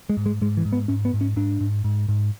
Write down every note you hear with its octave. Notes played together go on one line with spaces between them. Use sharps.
G#3
G#2
G#3
G#2 G#3
E3
G#2
B3
G#2 C#4
B3
G#2
C#4
G#2 D4
G#2
G#2
G#2